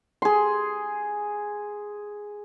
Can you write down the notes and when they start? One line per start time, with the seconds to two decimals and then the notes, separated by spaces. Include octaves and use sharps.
0.22 G#4 C6